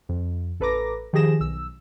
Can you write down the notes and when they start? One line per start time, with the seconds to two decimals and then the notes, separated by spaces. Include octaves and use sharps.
0.09 F2
0.60 A1 A4 B4 A#5 D6 A#6
1.13 D#3 F3 G4 G#4 A#6 E7
1.40 B1 E6